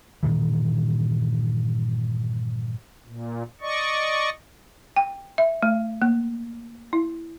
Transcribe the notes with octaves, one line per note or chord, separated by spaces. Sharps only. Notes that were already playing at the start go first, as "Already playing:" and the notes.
G2 A#2 D#3 E3
A#2
D5 D#5 C#6
G5
E5
A3
A#3
E4